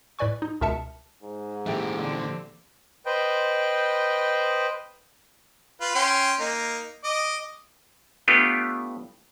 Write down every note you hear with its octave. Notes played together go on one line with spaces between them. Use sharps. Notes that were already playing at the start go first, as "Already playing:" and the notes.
A2 B4 D5 G#5 C#6
D#4
C#2 B2 A#4 E5 A5 C#7
G#2
A#2 E3 A3 G4
D3 C4
B4 C5 D#5 G5
F4 B4
C#4 G5 C6
A#3 D#4
D#5 D6
A3 B3 D4 F4 G4 B4